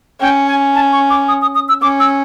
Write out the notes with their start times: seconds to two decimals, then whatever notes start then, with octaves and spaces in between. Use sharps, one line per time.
0.21 C#4 G5
0.47 G#5
0.75 A5
0.92 C#6
1.10 D6
1.28 D#6
1.42 D#6
1.55 D#6
1.69 E6
1.82 C#4 D6
2.00 E6